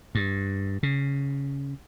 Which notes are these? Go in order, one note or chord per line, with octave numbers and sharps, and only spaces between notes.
G2
C#3